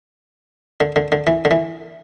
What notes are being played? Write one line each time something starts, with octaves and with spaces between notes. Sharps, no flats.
D3
D3
D3
E3
D3
E3